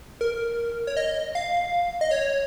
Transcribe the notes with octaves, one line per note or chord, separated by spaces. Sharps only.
A#4
C#5
D#5
F5
D#5
C#5